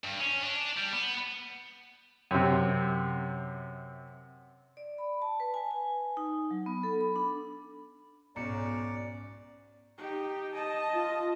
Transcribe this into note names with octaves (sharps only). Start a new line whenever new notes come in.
G2
C#4
D4
G3
B3
F#2 C3
D5
B5
A5
B4
G#5
G#5
D#4
F#3
B3
A4
B5
D4
B1 G#2 C#4 D5 A#5 C#7
D#4 G4
D#5 A5
F4